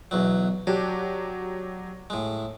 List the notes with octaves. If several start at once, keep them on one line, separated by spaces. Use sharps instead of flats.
B1 E2 F#3
F#3 D4 G4
A2 G#3